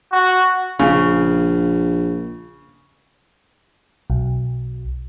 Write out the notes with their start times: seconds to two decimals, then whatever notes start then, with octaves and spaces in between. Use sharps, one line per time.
0.12 F#4
0.79 A#1 C#3
4.10 B1